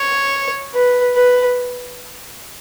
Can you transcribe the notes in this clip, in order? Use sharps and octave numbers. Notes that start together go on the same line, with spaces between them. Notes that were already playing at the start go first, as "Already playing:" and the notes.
Already playing: C#5
B4
B4